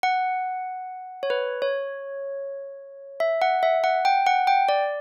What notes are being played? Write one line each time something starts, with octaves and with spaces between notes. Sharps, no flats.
F#5
C#5
B4
C#5
E5
F#5
E5
F#5
G5
F#5
G5
D5